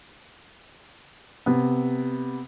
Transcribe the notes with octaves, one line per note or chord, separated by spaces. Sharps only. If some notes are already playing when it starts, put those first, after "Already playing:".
C3 B3